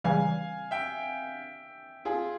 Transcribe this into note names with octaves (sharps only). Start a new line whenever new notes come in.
C#3 E3 G3 F5 G#5
E5 G5
F4 G#4